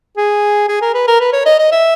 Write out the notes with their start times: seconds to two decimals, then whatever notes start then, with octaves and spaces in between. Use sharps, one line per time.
0.17 G#4
0.69 G#4
0.82 A#4
0.94 B4
1.08 A#4
1.20 B4
1.33 C#5
1.46 D#5
1.59 D#5
1.72 E5